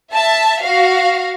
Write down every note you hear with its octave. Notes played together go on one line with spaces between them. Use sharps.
E5 A5
F#4 F5